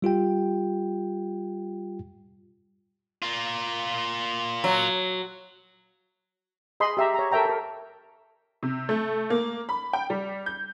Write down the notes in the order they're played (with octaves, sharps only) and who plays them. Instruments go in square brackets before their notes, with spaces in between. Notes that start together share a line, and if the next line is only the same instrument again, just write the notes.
[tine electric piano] G3 F4 G4 G5
[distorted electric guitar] A#3 F4
[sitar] F#3
[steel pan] G#4 D#5 B5 C6
G4 E5 A#5
C#5 A#5
A4 A#4 E5 G5 A#5
A4 A#4
[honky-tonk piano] C3
A3
A#3
B5
G5
G3
G6